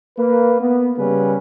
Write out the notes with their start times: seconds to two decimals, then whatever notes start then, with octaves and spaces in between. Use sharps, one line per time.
0.19 A#3 B4
0.61 B3
0.98 C#3 G3 C#4 B4